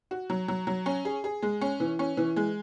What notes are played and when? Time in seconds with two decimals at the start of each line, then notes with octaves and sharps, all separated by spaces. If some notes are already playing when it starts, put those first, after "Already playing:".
0.11 F#4
0.30 F#3
0.48 F#3
0.67 F#3
0.86 C#4
1.05 G#4
1.24 G#4
1.42 G#3
1.61 C#4
1.80 E3
1.99 C#4
2.17 E3
2.36 G#3